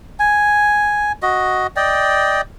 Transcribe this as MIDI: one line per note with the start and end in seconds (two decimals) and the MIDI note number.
0.19 1.12 80
1.22 1.67 66
1.22 1.67 75
1.76 2.41 74
1.76 2.41 75
1.76 2.41 79